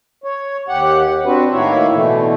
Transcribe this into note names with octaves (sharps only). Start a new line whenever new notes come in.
C#5
D#2 G4 F#5
C4 D4 F#4 B4
A2 D#3 A#3 E4 C#5 E5
B2 D3 E3 A3